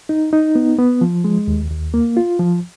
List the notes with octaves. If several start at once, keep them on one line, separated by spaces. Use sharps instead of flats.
D#4
D#4
B3
B3
F3
G#3
D#2
D#2
A#3
F4
F3